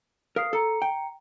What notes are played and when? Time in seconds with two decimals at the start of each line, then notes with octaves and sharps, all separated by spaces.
0.36 A#4 F5 D#6 C7
0.53 A4 A#5 C#7
0.82 G5